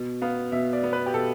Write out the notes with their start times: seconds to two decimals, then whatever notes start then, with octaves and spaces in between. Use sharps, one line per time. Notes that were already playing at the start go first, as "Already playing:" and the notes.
Already playing: B2
0.22 B3 F5
0.52 B2 E5
0.73 D5
0.83 B3
0.93 B4
1.06 G4
1.14 B2 A4